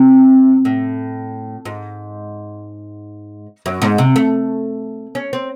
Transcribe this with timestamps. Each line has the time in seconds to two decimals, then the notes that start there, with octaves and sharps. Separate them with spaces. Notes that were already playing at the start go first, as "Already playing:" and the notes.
Already playing: C3
0.65 A2
1.65 G#2
3.66 F#2
3.82 G#2
3.98 C3
4.16 A3
5.15 C#4
5.33 C4